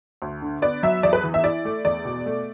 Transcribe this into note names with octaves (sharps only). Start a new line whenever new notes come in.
D2
D3
B3 D5
F#3 E5
E2 D5
B4
E3
E5
E4 D5
A3
E2 D5
B2
A3